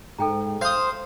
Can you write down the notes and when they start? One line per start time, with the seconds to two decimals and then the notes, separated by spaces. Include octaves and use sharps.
0.19 G#2 A4 G5 A#5
0.61 C5 F5 D#6